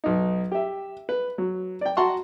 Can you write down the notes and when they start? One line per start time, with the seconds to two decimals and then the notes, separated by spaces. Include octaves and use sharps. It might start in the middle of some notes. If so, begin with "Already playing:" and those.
0.04 B1 D#4
0.52 G4 E5
1.09 B4
1.38 F#3
1.81 D5 G5
1.97 F#4 F#5 A5 A#5 C6 C#6